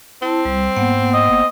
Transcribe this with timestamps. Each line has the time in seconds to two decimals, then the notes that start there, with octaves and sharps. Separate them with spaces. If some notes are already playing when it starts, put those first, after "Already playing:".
0.22 C4 E4 A5
0.45 C2 G3
0.76 G#2 A#3 B3 F#5
1.14 D#5
1.30 G1